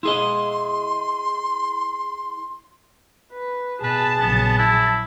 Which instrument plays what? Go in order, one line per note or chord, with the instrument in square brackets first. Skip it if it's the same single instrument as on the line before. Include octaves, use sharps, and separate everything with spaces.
[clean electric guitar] E4 G#4 D#5 [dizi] C6
[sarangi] B4
[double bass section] B2 [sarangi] G#4 [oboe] B4 [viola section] A5
[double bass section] A#1 C#3 F#3 [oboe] B3
[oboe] E4